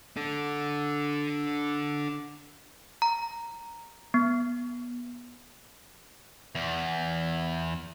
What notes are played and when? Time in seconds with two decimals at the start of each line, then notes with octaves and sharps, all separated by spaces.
0.17 D4 A4
3.02 A#5
4.14 B3
6.55 E2